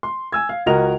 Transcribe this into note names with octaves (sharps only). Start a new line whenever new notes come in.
C6
G#5 E6 G#6
F5
C#2 F#4 A#4 D#5 F7